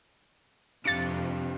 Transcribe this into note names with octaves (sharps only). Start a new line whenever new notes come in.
F2 C3 D4 G4 F5 A6 C#7